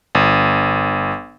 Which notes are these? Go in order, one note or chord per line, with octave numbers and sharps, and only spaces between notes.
G1